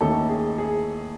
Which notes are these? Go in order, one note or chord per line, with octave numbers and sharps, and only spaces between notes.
D#2 D#3 A3 C#4 A4
G#4
G#4